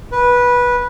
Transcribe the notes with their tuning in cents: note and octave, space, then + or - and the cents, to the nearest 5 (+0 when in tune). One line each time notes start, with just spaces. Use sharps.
B4 -15